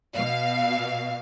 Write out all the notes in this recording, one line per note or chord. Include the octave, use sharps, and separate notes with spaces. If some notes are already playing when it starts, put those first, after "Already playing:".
B2 F5